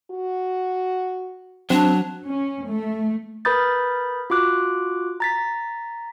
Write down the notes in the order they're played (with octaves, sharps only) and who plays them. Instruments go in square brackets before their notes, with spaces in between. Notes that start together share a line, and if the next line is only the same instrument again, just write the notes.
[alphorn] F#4
[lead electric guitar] F#3 [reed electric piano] C4 [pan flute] D4
[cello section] C#4
A3
[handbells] A#4 B4 B5 D#6 G6 A6
F4 F#4 D6 F#6
A#5 A6 B6